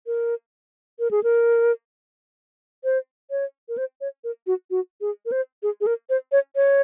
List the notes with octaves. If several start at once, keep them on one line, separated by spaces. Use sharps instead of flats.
A#4
A#4
G#4
A#4
C5
C#5
A#4
C5
C#5
A#4
F#4
F#4
G#4
A#4
C5
G#4
G#4
A#4
C5
C#5
C#5